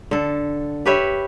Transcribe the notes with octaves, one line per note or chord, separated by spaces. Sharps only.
D3 A4
G4 B4 C#5 E5